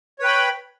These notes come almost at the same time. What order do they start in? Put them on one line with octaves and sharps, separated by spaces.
C#5 B4 G5 B5